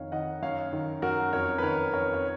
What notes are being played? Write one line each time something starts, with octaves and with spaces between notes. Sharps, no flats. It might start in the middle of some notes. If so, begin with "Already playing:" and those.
Already playing: F2 D#3 C#5 F5
D#3 D#5 F#5
F#2 C#5 F5
D#3
F#2 F#4 A#4
F2 A#4 C#5
B4
D#3 A#4 C#5
F2 A#4 C#5
C#5